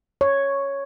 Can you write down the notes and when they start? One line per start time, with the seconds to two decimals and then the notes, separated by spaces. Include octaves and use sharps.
0.21 C#5